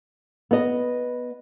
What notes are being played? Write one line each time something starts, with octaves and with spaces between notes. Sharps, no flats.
B3 D#5